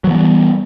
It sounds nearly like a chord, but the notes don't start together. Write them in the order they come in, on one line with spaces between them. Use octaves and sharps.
F#3 E3 B3 G3